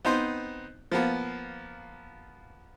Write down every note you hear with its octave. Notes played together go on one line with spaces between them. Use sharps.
B3 C4 D#4 C5
F3 A#3 B3